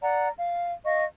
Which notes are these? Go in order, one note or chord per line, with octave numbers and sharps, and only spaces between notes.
D5 F#5 A#5
F5
D#5 F5 C#6